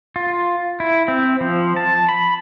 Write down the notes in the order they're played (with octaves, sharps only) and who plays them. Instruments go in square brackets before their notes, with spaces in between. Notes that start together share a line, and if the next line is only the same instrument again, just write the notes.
[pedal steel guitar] F4
E4
C4
F3
A5
B5